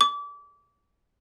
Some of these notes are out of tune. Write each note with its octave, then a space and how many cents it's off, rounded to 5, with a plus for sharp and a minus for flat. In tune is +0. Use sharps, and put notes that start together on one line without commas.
D6 -30